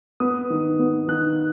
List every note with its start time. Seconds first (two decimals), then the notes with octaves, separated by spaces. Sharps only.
0.20 B3 D#6
0.50 D#3
0.79 B3
1.08 D#3 F#6